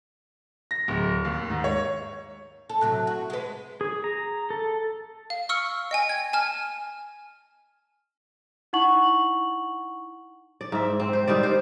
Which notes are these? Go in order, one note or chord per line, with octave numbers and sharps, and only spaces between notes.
A#6
D1
D#2
G#2
C#5
A4
A2 C3 F#3
F#4
G#3 B4
G#4
A#5
A4
F5
C#6 E6 F6 C#7
D#5 G5 G#5
G#6
G#5 A5 F6
D#4 E4 F#5 C#6 F#7
D5
G#2 E5
C4
C5
D#3 G3 C4 D5
C5